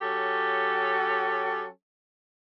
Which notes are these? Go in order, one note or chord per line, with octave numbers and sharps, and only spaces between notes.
F#3 C#4 G4 A4